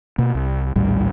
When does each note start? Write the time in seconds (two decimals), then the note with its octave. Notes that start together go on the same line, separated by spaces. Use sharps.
0.18 B2 A#3
0.35 C2
0.76 A#1 D#2 A2 G3